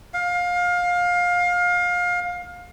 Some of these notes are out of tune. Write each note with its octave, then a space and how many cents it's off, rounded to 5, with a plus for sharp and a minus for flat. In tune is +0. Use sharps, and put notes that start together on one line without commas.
F5 +25